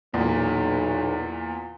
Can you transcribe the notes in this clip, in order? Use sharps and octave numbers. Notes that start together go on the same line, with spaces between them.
B1 E2 A#2